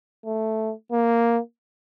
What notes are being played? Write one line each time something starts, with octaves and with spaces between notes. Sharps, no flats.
A3
A#3